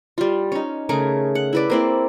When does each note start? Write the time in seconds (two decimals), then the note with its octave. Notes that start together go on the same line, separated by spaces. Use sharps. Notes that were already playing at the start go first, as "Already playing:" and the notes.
0.18 G3 F4
0.52 C#4 D#4
0.89 C#3 A3 G#4 A#4
1.35 F#5
1.53 E4 B4 D5
1.70 A#3 C4 E4